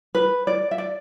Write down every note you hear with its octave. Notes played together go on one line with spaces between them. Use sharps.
B4
D5
E5
D5